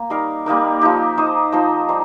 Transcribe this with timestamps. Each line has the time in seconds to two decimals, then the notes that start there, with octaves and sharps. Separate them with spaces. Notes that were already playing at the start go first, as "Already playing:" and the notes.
Already playing: A#3
0.10 G3 D#4 A#4 F5
0.46 G3 A#3 D#4 A#4
0.81 F3 D#4 G4
1.18 D#4 C5 D#5
1.52 F3 D#4 C5 D#5
1.89 G3 D#4 C5